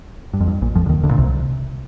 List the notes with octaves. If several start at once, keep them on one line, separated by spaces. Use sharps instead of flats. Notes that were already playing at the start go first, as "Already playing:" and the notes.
G2
F2
G2
A#1 A#2
F2 F3
D3
D#2 D#3
D2 D3
A#2
C2 C3